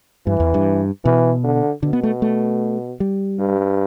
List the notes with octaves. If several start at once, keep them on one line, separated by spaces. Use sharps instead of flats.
G2 E3
E2
G2
B2 E3
D3
B2 D3
B3
A3
A3
G3
G2